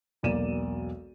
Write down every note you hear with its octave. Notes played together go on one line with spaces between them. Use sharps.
E1 B1 A#3 D5 D#7 E7